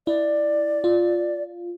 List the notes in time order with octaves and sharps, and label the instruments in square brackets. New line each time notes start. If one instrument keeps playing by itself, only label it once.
[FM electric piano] E4 [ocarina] D5
[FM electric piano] F4